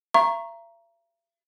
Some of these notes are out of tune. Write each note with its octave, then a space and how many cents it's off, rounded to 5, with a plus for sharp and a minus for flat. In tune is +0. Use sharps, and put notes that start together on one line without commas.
E5 +45 A#5 +5 C#6 -15